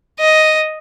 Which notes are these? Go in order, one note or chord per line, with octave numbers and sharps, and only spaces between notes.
D#5